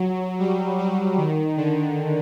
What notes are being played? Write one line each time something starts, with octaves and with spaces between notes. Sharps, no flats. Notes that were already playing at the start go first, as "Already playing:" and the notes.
Already playing: F#3
G3
G3
D#3
D3